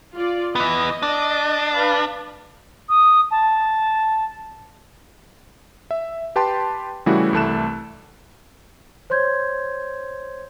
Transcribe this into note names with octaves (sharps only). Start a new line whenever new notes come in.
F4 D5
E3 B3 D#5
D4
B4 F5 B5
D#6
A5
E5
G4 B4 G5 A5 C6
C#3 E3 G3 A3 E4 F#4
C2 E3 A3 A5 F#6 E7
C5 C#5 C6 G6 G#6